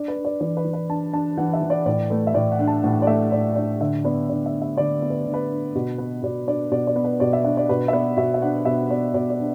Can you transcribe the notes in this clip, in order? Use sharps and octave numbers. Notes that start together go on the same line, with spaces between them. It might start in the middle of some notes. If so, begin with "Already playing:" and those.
Already playing: D4 D5
B4
D4
D5
E3 D5
B4
E3
B4
D4 A5
D4 A5
E3 F#5
E5
E3
D5
A2 D5
A3 B4
E5
A2 D5
F#5
D4
A5
A2 F#5
D5
A3 E5
A2 D5
D4 D5
D3 E5
B3 D5
D3 D5
E5
D4
E5
D3 D5
B3
B4
D3
B4
D4
B2
B3
B2 D5
D4 D5
B2 D5
D5
B3
B4
B2 D5
E5
D4 E5
D5
B2 B4
E5
B3 D5
B2 E5
E5
D4 F#5
B2 E5
B3 D5
B2 D5
D5
D4